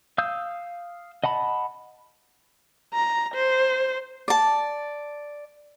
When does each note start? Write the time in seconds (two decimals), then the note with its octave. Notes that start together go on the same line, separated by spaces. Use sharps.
0.18 F5 D#6 E6 G6
1.24 D#5 F#5 A5 B5
2.94 A#5
3.34 C5
4.28 D5 A5